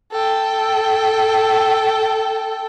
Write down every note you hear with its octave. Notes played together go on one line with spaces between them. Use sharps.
A4 G5